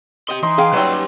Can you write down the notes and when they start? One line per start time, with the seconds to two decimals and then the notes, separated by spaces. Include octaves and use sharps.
0.28 G4 D#5 G5 C6
0.43 E3 D#4 C6
0.58 G#4 F5 G5
0.73 F#3 G3 C#4 D#4 B4 C#5 E5 G5
0.92 G4